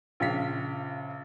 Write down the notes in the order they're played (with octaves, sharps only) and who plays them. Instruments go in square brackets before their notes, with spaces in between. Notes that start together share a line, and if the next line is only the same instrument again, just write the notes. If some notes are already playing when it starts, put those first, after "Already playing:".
[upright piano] A#1 C#3 F5 B6